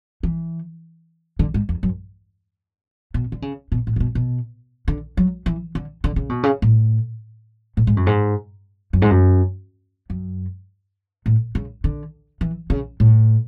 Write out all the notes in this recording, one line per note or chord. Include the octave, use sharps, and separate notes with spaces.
E3
D3
G#2
E2
F#2
B2
D3
C#3
B2
A2
C#3
B2
B2
D3
F#3
E3
D3
D3
C#3
B2
C#3
A2
A2
G#2
F#2
G#2
F#2
G#2
F#2
F#2
A2
C#3
D3
E3
C#3
A2